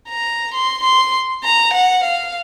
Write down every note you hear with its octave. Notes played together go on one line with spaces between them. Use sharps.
A#5
C6
C6
A#5
F#5
F5